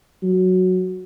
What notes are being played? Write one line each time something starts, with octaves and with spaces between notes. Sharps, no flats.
F#3